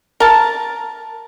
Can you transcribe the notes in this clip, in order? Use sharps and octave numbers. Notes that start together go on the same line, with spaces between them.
A#4 A5